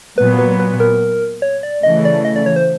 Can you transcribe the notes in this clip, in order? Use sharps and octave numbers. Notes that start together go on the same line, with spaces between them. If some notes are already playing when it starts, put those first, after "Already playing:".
A#2 F#3 B3 B4
B4
B4
A#4
C#5
D5
C#3 E3 A3 D#5
D5
D#5
D5
C#5
C5